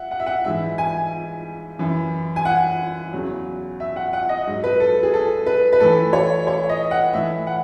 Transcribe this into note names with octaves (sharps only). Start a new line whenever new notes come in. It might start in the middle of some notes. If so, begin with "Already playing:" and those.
Already playing: E5 F#5
F#5
E5
F#5
G#2 E3 E5
G#5
F#2 E3
G#5
F#5
E2 C#3 F#3
E5
F#5
F#5
D#5
G#2 F#3
B4
A4
G#4
A4
B4
B4
A2 E3 A4
C#5
C#5
D#5
F#5
A2 E3 E5
F#5